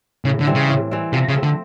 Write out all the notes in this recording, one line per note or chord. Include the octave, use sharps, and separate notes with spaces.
A2 C#3
D3
E3 G3 C4
C#3
A2
E3 G3 C4
C3 F3
C#3
A3 C4
D3